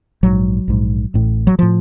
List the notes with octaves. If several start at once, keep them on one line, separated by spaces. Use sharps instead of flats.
A#1 G#2 F#3
A#1 G#2
A1 A2
F#3
A2 F3